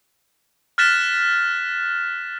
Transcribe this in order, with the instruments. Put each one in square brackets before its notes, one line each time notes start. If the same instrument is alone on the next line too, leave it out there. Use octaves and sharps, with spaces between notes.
[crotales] F6 F#6 A6 B6 E7